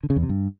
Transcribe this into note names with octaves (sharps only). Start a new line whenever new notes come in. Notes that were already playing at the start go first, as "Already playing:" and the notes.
D3
C#3
E2
C3
G2